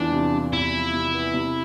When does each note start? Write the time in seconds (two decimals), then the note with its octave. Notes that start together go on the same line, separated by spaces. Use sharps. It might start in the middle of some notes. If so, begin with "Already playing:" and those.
Already playing: E2 E3 D4 F4
0.12 C3
0.33 G3
0.53 E2 E4
0.73 F3
0.94 C3
1.14 B3
1.34 C3